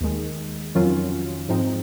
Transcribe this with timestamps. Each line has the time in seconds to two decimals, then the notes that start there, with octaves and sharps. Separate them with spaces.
0.01 D#2 D#3 G#3
0.75 F2 D#3 F#3 C#4 F4
1.49 G#2 F3 C4 D#4